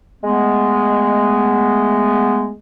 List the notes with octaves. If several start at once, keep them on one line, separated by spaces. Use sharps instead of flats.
G#3 A3 B3